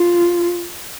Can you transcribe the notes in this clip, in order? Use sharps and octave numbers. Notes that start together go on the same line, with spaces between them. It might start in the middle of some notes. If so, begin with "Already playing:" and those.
Already playing: F4